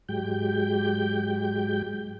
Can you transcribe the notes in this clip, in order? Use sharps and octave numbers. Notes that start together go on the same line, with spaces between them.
G#2 F#3 G#3 G4 G5 G6